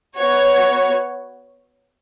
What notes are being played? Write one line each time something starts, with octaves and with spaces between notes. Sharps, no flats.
B3 F#4 C#5